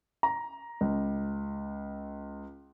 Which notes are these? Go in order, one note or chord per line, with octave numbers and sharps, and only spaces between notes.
A#5
C#2